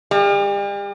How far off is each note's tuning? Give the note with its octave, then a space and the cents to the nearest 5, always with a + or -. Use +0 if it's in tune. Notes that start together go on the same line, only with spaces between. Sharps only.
G3 +40